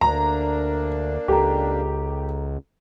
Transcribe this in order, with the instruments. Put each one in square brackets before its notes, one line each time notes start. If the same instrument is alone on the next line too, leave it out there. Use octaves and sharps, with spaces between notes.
[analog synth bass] D2 [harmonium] A#3 D4 [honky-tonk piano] A#5
[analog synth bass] C#2 [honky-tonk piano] G4 [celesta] A4 A#5